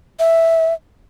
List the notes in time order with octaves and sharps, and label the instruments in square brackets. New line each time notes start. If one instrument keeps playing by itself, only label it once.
[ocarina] E5